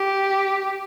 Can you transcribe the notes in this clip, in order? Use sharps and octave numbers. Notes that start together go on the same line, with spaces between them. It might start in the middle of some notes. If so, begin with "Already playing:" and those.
Already playing: G4